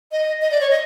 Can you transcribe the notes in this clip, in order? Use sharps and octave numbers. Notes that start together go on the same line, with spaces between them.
D#5
D#5
D5
C#5
D#5